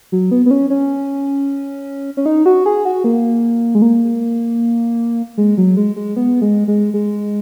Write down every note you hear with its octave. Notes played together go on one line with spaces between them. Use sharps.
F#3
B3
B3
C#4
C#4
C#4
D#4
F#4
G#4
F#4
A#3
G#3
A#3
G#3
F#3
G#3
G#3
B3
G#3
G#3
G#3